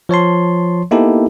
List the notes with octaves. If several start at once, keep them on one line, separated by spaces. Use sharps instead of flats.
F3 C#5 A5 C6
A#3 B3 D#4 E4 G4 A4